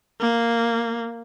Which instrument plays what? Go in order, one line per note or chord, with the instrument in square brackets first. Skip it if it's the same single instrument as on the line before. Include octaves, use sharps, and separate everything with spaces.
[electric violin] A#3